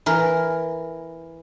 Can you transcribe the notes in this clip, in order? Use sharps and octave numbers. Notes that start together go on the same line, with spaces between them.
E3 A#4